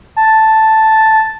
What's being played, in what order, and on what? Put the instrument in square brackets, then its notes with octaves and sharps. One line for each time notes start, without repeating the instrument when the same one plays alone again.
[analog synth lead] A5